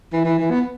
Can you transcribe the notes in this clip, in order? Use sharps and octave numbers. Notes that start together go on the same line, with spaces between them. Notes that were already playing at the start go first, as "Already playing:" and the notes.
E3
E3
E3
B3